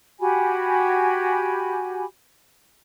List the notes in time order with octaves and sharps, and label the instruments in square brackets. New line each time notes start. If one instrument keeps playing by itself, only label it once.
[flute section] F#4 G4 G#5 B5